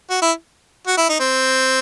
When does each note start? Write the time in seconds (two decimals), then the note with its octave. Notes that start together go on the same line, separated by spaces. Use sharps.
0.10 F#4
0.22 E4
0.87 F#4
0.98 E4
1.09 D#4
1.20 C4